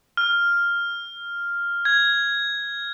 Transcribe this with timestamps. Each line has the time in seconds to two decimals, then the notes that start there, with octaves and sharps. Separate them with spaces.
0.17 F6
1.85 G#6